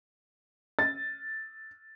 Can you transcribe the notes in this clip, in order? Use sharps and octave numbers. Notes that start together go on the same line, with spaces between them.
A6